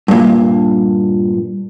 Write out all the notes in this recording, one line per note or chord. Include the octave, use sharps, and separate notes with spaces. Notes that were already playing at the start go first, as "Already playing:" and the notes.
G2 A#2